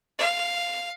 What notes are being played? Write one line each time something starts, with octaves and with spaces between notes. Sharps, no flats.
F5